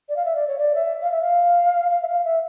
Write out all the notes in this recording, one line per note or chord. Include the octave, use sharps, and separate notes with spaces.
D5
F5
E5
D5
C#5
D5
E5
F5
E5
F5
F5
E5
F5
E5